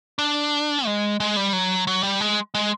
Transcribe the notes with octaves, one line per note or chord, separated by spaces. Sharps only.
D4
G#3
G#3
G3
F#3
F#3
G3
G#3
G#3